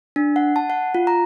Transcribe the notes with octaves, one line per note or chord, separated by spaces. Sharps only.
D4
F#5
A5
F#5
F4
A#5